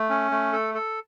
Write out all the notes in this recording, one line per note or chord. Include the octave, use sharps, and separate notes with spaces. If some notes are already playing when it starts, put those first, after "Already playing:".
Already playing: A3
C#4
A3
A4
A4